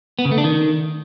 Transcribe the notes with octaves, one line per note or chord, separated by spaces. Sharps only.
B3
C#3
A3
D4
D#3